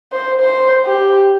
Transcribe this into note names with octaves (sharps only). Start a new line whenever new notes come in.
C5
C5
G4